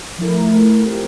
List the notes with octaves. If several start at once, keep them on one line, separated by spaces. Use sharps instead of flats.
F3 A3 E4 A#4
F3 A3 E4 A#4
F3 C4 G4 A#4